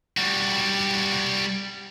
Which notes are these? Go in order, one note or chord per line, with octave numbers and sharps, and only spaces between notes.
G3 F#4